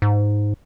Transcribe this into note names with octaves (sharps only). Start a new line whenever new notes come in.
G#2